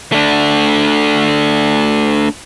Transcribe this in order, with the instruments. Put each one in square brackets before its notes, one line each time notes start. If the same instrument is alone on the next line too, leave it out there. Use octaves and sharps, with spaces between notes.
[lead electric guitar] A3 D4